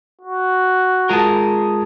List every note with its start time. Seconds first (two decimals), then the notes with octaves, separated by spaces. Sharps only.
0.21 F#4
1.09 G#3 F4 A#4 A5